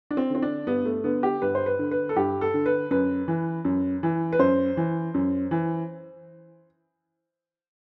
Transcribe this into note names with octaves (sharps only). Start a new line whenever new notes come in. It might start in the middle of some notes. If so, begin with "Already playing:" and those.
D4
C4
D3 C4
D4
G2 B3
A3
D3 B3
G4
G2 B4
C5
B4
D3
B4
A4
G2 G4
A4
D3
B4
F#2 B4
E3
F#2
E3
B4
F#2 C5
E3
F#2
E3